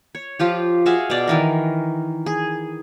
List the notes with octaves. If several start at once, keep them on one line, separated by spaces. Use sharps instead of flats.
C#5
F3 F4 G4
F#4 G#4 E5 F5
B2 D5
D#3 E3 A#4
G#4